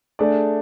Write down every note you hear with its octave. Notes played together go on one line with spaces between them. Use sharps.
A3 D4 G#4 D5